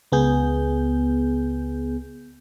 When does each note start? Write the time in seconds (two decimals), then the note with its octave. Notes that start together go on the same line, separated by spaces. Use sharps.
0.12 C#2 B3 G#4 G6